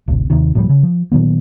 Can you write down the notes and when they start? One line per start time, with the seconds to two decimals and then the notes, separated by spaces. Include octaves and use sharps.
0.08 D1 G#1 C3
0.30 D#2 C3 D#3
0.55 D1 A2 F3 G3
0.69 C#3
0.83 F3
1.12 A#2 D#3 F#3 B3